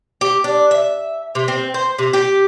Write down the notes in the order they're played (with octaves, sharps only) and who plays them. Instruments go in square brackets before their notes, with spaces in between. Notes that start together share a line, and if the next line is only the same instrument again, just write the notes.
[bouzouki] G4
D4
E5
C3
C4
C5
C3
G4